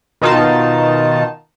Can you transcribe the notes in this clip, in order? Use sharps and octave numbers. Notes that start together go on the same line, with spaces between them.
B2 D#3 D#4 F4 A5